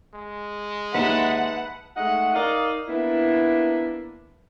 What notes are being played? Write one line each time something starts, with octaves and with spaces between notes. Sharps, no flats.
G#3
D#2 D#4 B4 E5 F#5 A5
G#2 A3 D#5 F#5
D#4 A#4 D5 D#5 F5
A#3 B3 D4 E4